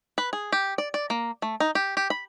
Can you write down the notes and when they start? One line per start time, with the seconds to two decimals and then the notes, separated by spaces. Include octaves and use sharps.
0.18 B4
0.33 G#4
0.52 G4
0.78 D5
0.94 D5
1.10 A#3
1.42 A3
1.60 D#4
1.75 G4
1.97 G4
2.10 B5